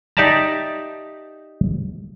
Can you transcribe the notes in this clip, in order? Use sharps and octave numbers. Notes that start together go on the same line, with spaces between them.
D#4 G4 D5 E5 A5 A#5